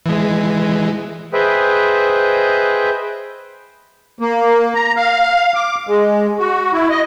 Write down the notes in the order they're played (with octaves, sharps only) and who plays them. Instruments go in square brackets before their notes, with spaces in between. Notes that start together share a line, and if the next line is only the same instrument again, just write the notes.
[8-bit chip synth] E3 G#3
[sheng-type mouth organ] G#4 B4 C5 D#5 E5 G5
[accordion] A#3
A#5
F5
D6
G#3
F#4
E4
D#5